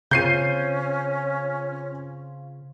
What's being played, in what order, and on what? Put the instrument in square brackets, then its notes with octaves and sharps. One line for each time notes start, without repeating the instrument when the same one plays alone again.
[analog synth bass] C#3 [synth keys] C4 F4 [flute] C#4 [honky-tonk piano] G6 C7 D#7